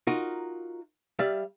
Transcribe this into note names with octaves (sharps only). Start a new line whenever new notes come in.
D#4 F4 F#4 A#4
G3 D5 E5 F5